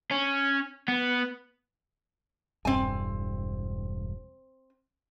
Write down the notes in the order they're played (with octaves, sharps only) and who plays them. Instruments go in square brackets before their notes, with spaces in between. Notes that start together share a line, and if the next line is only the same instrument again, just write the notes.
[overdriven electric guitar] C#4
B3
[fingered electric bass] E1 G2 [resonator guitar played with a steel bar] C4 G#5